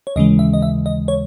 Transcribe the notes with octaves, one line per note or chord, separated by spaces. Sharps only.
C#5
D#2 C#3 E3 G#3 D#5
E5
D#5
E5
D#5
C#5